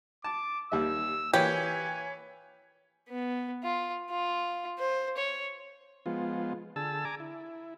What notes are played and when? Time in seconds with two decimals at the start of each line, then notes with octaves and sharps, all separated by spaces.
0.24 A5 D6
0.72 D#2 G3 E5 E6
1.33 E3 A#3 G4 B4 C#5 G#5
3.09 B3
3.64 F4
4.10 F4
4.79 C5
5.17 C#5
6.06 F3 G#3 B3 F4
6.76 D3 G#4 A5 E6
7.05 G#5 A#5 D6
7.20 E4